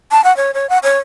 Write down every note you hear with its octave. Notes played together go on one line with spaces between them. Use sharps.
A5
F#5
C#5
C#5
F#5
C#5